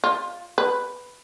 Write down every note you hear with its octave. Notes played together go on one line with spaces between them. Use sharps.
F4
B4